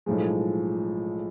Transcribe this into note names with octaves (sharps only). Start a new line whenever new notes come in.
B1 A2 F3 G#3